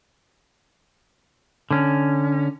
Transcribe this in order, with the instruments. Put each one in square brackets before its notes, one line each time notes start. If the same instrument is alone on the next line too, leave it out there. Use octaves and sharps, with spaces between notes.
[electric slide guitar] D3 C#4